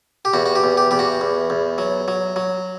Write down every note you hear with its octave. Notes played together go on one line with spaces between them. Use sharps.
G4
E2 F#4
F#4
G4
E2
G4
E2 G4
F#4
E2
E2
F#3
F#3
F#3